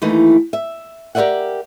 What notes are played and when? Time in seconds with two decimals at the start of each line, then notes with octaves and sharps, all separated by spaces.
0.02 D#2 E3 A3 D#4
0.53 E5
1.15 G4 A#4 C5 D5 E5 F#5